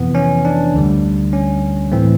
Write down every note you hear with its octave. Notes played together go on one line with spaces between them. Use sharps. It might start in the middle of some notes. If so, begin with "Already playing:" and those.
Already playing: F2 C3 E3 B3
C#4
D4
D2 D3 G3
C#4
A2 E3 A3 C4